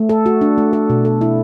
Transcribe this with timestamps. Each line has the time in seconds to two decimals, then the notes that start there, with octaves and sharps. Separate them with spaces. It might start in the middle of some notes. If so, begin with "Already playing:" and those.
Already playing: A3
0.09 A4
0.26 F#4
0.41 D4
0.58 A3
0.73 A4
0.90 B2
1.05 A4
1.21 E4